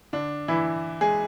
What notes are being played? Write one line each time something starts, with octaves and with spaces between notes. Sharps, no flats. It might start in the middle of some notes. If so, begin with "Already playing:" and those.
D3 D4
E3 E4
G#3 G#4